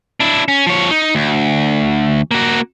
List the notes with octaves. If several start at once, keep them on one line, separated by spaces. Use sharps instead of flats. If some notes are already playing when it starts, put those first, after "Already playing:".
D4 E4
C#4
F3 C#5
D#4
D2
A#3 F#4